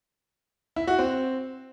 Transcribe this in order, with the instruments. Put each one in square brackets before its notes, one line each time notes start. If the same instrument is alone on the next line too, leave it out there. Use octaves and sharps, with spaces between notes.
[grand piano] E4
F#4
C4